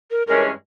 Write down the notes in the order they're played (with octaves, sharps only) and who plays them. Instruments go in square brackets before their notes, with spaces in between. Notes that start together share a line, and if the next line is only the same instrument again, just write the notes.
[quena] A#4
[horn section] G2 E3 G#3 C#4 [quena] A#4